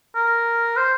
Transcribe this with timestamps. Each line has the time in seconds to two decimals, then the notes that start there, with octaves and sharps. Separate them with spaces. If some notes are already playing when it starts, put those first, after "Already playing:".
0.15 A#4
0.77 C5